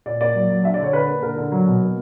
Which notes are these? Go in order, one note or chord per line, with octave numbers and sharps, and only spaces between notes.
A#2 D5
A#3 D5
F#3
F#3
D4 E5
D5
D3 C#5
D3 B4
A#3
D3 A#4
D3
F#3
B2
A#3